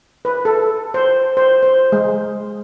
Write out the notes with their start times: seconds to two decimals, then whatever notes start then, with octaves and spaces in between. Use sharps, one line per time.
0.25 B4
0.45 A4
0.94 C5
1.37 C5
1.63 C5
1.92 G#3